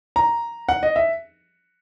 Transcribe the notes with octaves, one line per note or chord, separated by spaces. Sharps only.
A#5
F#5
D#5
E5